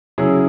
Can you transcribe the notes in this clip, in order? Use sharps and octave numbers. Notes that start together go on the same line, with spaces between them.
C#3 F#3 C#4 E4 G#4